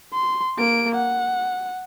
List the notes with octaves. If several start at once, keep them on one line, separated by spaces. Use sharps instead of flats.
C6
A#3 D7
F#5